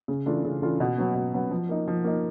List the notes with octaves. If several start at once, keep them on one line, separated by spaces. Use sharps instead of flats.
C#3
E3 A3 D4 F4
C#3
E3 A3 D4 F4
B2
F#3 B3
B2
F#3 B3
F3
A#3 D#4
F3
A#3 D#4